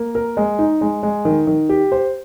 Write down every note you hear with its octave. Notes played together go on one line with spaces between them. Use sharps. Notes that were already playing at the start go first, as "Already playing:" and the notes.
Already playing: A#3
A#4
G#3
D#4
G#3
G#3
D#3
D#3
G4
C5